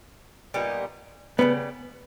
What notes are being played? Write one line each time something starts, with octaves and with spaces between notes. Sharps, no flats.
A#2 G3 B3 D#4
C#3 E3 G3 B3